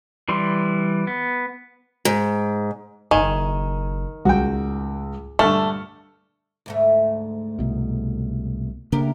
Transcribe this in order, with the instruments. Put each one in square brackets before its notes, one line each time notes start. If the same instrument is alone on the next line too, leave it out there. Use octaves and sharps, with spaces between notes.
[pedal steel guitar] E3 G3 C6
B3
[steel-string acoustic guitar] G#2
[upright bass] F#1 C#4 [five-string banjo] D#3 [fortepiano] G#5
[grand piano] C#2 [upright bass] A2 [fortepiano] F#4 G5
[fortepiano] G2 D3 A5 [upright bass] A#2 [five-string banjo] A3 [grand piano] C#6 F6
[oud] D2 G#2 A3
[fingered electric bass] C2 B2
[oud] D2 G4 A#4 [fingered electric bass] C#3 A#3 D4